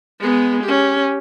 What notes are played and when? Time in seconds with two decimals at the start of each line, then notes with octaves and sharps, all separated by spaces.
0.20 G#3 B3
0.64 C#4 G4